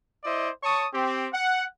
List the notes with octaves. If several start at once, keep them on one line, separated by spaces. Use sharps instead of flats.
E4 C5 D5 D#5
C#5 A5 C#6 D#6
C4 G4
F#5